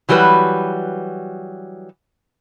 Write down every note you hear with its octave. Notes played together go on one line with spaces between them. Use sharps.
E3 F#3 G3 F#4 B4